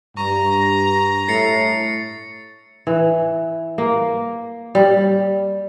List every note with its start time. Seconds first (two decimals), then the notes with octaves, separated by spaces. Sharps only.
0.17 G2 A#5 C#6
1.28 A2 A6 C7 C#7
2.87 E3
3.78 A#3
4.75 G3